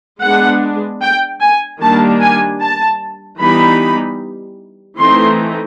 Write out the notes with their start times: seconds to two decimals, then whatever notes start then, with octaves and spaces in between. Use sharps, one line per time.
0.22 G#3 B3 D4 F#5
1.02 G5
1.41 G#5
1.81 D#3 G3 A#3 D4 A5
2.21 G#5
2.61 A5
3.40 E3 G3 B3 D#4 B5
4.98 E3 A3 C4 D#4 C6